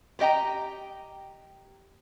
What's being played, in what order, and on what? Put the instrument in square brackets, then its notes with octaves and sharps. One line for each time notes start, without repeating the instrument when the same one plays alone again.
[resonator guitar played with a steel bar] B3 G4 D#5 G5 A#5